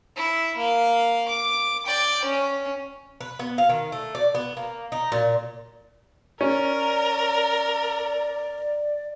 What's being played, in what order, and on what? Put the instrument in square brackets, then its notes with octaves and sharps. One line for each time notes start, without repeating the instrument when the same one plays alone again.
[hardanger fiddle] E4
A#3 F5
D6
D5 G5
C#4
[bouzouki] B4
B3
F5
D#3
A3
D5
B3
A#3
D#4
A#2
[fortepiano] C#4 [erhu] A#4 [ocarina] D5